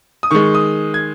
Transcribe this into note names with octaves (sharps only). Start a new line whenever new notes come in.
D#6
D#3 G#3 C#6
D#6
G#6